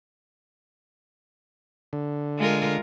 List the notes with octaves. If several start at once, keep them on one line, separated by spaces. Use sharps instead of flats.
D3
G#3 F4 A#4